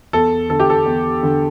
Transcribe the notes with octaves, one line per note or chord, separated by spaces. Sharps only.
E2 A4
D3 A4
G4
A4
E2
D3